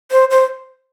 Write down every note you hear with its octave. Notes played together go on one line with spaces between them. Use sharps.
C5
C5